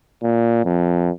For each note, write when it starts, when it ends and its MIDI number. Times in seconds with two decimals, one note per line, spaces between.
0.23 0.64 46
0.65 1.10 41